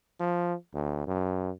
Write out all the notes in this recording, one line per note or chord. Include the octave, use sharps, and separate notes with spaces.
F3
D2
F#2